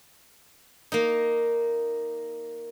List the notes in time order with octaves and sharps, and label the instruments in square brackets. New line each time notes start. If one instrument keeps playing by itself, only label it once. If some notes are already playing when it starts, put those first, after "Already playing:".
[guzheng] A#3 D#4